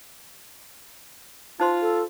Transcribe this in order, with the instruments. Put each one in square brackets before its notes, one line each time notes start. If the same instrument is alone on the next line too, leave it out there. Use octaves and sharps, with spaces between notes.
[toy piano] D#4 C5 C6 [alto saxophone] F4
[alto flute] A4